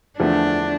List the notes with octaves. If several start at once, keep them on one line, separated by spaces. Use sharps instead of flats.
E2 D3 F3 A3 D4